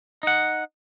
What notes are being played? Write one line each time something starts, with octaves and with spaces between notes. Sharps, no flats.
D#4 F#5